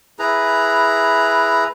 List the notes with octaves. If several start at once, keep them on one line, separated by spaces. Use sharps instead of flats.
E4 G#4 B4 A#5